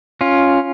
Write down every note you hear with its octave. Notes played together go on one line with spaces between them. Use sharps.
C#4 F4